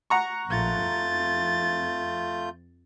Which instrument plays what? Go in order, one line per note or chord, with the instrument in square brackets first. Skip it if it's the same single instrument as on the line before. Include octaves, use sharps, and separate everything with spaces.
[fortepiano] F#5 A#5 C#6
[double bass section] A#1 [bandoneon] A3 F4 G6 [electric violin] A6
[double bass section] F2